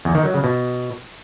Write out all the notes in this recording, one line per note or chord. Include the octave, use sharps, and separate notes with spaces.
E2
D#3
F#3
C#3
B2